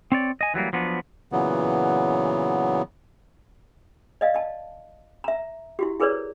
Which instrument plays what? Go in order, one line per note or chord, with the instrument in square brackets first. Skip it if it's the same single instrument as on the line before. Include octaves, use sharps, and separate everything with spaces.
[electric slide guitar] C4 C#5 D5
D#5 G#5
E3 F#3 G3 A#3
F3 F#3 B3 D4
[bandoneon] A#2 C#3 E3 F#3 B3
[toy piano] D5 D#5 F5
D#5 A5
E5 A#5
E4 F#4 G4
E4 G#4 A#4 B4 C#5 D5